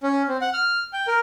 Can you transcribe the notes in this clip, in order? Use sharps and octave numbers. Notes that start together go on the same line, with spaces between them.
C#4
C4
F#5
F6
G5
A#4